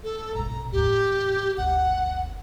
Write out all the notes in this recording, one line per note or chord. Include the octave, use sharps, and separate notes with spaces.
A4
A#1 B2 A#5
E2 A2 G4
G1 D2 F#5